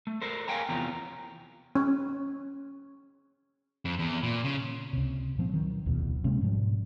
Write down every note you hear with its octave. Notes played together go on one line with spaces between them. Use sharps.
A3
A4 A#4 C5
A#4 C#5 F5 G5 G#5 A#5
E2 C3 F3 A#5
C#4
F2
E2
A#2
C#3
C#2 C3
A#2 F3 G#3 C4
D#3 F#3
D1 A#1 E2 B2
C3 G#3 A#3 C#4
G#2 B2 F3 G3